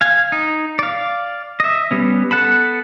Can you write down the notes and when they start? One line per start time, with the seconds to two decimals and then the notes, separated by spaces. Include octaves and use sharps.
0.01 F5 G#5
0.32 D#4
0.79 D5 F5
1.60 D#5 E5
1.91 G3 B3 C#4
2.31 B3 A4 F#5 A5 B5